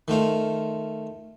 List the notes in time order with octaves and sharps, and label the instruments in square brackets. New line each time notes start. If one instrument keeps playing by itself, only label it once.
[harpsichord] D#3 A3 F4 C5